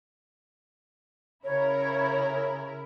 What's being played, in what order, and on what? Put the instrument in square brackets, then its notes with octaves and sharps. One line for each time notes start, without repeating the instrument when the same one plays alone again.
[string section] C#3 E4 A#4 [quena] C#5